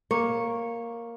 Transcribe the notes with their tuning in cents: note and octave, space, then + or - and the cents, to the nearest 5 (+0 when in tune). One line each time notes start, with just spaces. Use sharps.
A#3 +0 C#5 -10